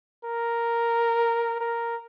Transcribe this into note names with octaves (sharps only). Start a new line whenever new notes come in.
A#4
A#4